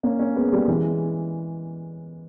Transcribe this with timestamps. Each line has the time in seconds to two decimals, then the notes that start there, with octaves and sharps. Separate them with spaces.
0.03 A#3 C#4
0.19 A#3 C#4
0.36 G#3 B3
0.52 G3 A#3
0.68 E3 G#3